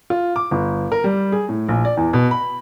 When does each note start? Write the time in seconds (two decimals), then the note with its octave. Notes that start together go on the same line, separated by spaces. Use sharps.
0.10 F4
0.36 D6
0.51 G1
0.92 A#4
1.04 G3
1.32 G#4
1.49 A2
1.69 A#1
1.85 D5
1.97 E2
2.13 B2
2.31 B5